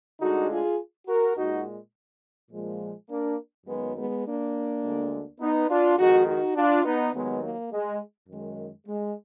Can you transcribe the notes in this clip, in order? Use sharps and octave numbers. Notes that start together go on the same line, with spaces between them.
D2 D3 G#3 D#4 F#4
F4 G#4
F#4 A#4
A#2 G#3 D#4 F#4
A#2 F3 G#3
A#3 D4
F#2 D#3 F#3 G#3 B3
G#3 B3
A#3 D4
D2 D3 G#3
B3 D#4
D4 F4
F2 D#3 G#3 D#4 F#4
D#4 F#4
D4 F4
B3 D#4
D#2 D#3 F#3 G#3 B3
A#3
G#3
F#2 D#3 G#3
G#3